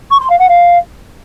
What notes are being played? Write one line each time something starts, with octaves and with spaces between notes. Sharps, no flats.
C#6
C6
F5
F#5
F5